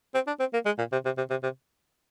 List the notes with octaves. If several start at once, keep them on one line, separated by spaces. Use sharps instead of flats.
C4
D4
C4
A#3
G#3
A#2
C3
C3
C3
C3
C3